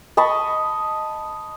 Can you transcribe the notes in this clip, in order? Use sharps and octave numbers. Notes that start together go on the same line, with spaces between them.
D#5 A5 B5 C#6